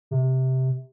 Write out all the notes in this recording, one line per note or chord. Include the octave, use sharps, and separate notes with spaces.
C3